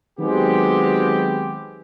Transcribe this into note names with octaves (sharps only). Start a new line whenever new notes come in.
D#3 F#3 G#3 B3 C4 G4